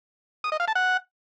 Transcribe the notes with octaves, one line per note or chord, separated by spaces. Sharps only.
D#6
D#5
F5
A5
F#5